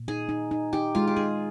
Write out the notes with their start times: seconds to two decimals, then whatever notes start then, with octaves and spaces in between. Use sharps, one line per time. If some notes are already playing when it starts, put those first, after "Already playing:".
Already playing: A#2
0.08 D#4 G#4
0.29 D#4
0.51 D#4
0.73 D#4 G4
0.95 G#3 F4
1.07 G4
1.16 D#4 G#4